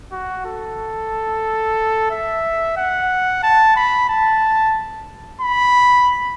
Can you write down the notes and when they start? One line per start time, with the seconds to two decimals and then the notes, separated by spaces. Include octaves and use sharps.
0.12 F#4
0.46 A4
2.11 E5
2.77 F#5
3.43 A5
3.76 B5
4.09 A5
5.42 B5